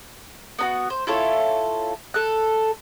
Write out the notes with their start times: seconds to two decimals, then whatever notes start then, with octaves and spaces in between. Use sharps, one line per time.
0.59 B3 D#4 F#4
0.90 C5
1.07 E4 F4 A4 C#5
2.14 A4 F#6